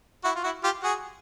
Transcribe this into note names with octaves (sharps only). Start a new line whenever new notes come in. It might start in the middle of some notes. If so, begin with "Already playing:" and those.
E4 F#4
F4
E4 F#4
F4 G4
F#4 G#4